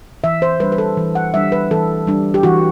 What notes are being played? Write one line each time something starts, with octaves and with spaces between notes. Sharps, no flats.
E3 E5
C5
G3 D4 B4
B4
A4
E3
F#5
G3 D4 E5
B4
E3 A4
G3 D4
G4
E3 F#4